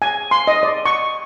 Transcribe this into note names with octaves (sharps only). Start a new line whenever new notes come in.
G#5
C6
D#5
D5
C#6